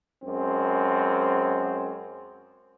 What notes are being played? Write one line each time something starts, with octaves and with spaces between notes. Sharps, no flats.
F#2 G#3 C4